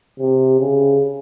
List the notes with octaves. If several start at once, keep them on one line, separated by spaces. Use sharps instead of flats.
C3
C#3